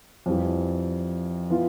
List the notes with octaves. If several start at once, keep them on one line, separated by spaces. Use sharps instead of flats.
F2 E3 G3
E3 B3 F4